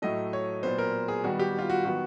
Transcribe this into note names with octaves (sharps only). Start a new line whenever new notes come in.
A2 F#3 A3 D#5
C#5
A#2 F#3 B3 C5
A#4
G#4
D#3 G3 B3 F#4
G4
F4
F#4
D#3 F#3 B3 F#4